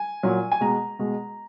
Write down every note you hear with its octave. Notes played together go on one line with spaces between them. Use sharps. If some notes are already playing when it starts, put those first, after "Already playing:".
Already playing: G#5
A#2 F#3
G#5
B2 G#3 A#5
B2 G#3